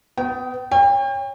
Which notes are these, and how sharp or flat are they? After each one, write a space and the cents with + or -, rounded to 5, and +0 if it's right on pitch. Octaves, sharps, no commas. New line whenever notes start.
B3 +25 G5 -30
C#5 +0 G5 +40